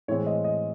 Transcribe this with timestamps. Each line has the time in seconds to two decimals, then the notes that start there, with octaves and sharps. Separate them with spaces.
0.08 A2 E3 G#3 C4 C#5
0.27 D#5
0.44 D#5